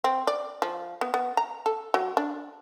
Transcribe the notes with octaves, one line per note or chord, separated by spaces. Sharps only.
C4
D5
F3
B3
B3
A#5
A4
F#3
D4